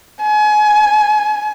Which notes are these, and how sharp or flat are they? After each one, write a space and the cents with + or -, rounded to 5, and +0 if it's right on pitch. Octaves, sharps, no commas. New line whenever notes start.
G#5 +30